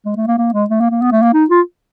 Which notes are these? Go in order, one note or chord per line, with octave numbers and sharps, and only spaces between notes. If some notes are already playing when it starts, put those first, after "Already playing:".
G#3
A3
A#3
A#3
G#3
A3
A#3
A#3
B3
A3
A#3
D#4
F4